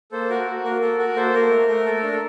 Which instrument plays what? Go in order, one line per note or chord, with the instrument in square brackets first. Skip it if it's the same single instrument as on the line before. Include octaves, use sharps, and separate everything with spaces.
[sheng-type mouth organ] A#3 A4 C5
F#4 A#4
F#4
A#3 A#4
A4 A#4
F#4 A#4
A#3 A4 C5
A#3 A#4
A3
A3
A4
D4
A4